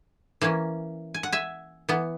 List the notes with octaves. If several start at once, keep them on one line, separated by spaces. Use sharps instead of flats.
E3 A#3 C#4
G#5
F#5
E5 G#5
E3 B3